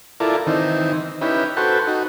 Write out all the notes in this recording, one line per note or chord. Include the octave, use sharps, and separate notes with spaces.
E4 F4 A4 A#4 D5
D#3 E3 C4 D#4
C#4 D#4 E4 G4 B4
F#4 A4 B4 C5 G5 C#6
D#4 F#4